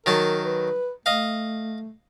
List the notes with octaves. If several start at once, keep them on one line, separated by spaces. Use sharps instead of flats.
D#3 F#3 A#4 A5
B4
A3 D#5 F5